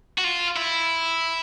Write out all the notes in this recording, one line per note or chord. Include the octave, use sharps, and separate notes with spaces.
F#4
F4
E4